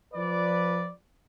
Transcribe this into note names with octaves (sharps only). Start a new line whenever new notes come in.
F3 B4 D5